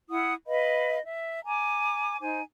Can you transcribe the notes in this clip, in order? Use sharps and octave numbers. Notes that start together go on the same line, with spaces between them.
E4 F#5 D#6
B4 D#5 F5 B5
E5
G#5 A#5 D6
D#4 C5 G#5